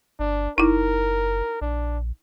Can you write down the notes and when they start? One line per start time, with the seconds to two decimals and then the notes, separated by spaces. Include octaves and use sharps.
0.19 G1 D4
0.58 F#1 D#4 E4 A#4
1.61 A#1 D4